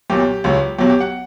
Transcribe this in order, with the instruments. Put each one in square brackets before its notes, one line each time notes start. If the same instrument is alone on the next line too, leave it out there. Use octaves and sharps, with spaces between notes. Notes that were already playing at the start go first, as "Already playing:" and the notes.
[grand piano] B1 A#2 F#3 G4
C#2 C#3 F#3
B1 B2 F#3 G4
G4
F#5